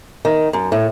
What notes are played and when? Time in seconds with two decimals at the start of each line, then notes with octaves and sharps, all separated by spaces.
0.25 D#3
0.53 F#2
0.72 A2